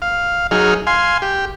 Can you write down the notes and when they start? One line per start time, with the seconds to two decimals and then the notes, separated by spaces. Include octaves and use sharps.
0.02 F5
0.51 F#3 D#4 G#4 F6
0.87 F5 G#5 C6
1.22 G4